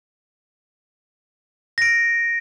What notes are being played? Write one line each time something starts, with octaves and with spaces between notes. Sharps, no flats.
A#6 D7